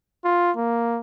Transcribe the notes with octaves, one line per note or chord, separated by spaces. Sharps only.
F4
A#3